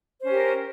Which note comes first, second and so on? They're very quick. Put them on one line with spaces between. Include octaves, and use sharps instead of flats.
C5 C#4 G4 A#4